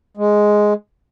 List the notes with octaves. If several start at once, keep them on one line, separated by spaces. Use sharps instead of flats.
G#3